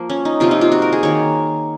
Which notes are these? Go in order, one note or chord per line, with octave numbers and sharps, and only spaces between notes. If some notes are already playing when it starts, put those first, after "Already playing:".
Already playing: F3 A#3
C#4
D#4
C3 F3 A#3 F4
D#4
F4
F#4
A#4
G#4
D#3 A#3 C#5